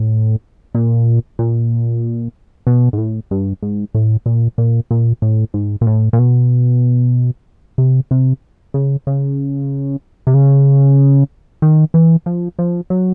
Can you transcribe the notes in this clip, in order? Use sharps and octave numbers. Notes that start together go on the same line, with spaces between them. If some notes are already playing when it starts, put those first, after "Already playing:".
Already playing: A2
A#2
A#2
B2
G#2
A2
G2
G#2
A2
A#2
A#2
A#2
A2
G#2
A#2
A2
A#2
B2
C3
C3
C#3
C#3
C3
C#3
D#3
E3
F3
F3
F#3